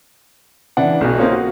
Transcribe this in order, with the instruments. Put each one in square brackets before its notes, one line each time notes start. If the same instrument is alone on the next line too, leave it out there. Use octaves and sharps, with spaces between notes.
[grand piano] C#3 E3 D4 F#5
B1 B2
A#3 C4 C#4 D#4 F4
F#4